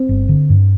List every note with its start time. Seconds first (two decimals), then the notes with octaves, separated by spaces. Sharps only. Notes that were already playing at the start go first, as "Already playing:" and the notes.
Already playing: C4
0.09 G1
0.29 D3
0.50 G2